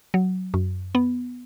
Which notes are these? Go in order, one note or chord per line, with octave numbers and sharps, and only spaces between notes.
F#3
F#2
B3